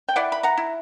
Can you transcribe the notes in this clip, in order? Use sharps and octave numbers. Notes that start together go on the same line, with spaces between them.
G5
E4 D5 F#5
B5
F#5 A#5
E4